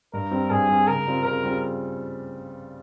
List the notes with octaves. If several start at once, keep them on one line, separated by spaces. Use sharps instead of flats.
G2 A#4
G3 C4
G2 G#4
G3 C4
C#3 A#4
G3 C4 F4 G#4
C#3 A#4
G3 C4 F4 G#4